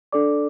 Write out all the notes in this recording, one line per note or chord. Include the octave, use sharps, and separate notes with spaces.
D4 A4 D5 D6